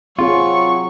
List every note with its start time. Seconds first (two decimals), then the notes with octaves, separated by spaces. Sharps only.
0.19 F#3 C4 F4 G#4 C#6